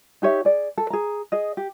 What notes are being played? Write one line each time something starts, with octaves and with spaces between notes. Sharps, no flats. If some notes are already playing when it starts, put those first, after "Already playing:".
D#4 G4 C#5 E5
G#4 D5
A4
G#4 A#5
G#4 D#5
G4